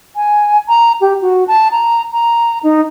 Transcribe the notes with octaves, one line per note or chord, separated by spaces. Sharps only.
G#5
A#5
G4
F#4
A5
A#5
A#5
D#4